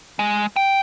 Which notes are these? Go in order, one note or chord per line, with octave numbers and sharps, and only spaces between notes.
G#3
G5